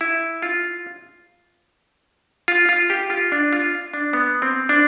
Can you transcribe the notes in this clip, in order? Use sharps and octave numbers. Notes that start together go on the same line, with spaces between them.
E4
F4
F4
F4
G4
F4
D4
F4
D4
B3
C4
D4